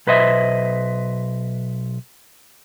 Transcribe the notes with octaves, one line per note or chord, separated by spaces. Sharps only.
B1 B4 C5 D#5 E5